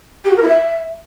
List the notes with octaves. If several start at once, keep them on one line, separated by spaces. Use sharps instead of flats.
G4
F#4
A#4
E4
E5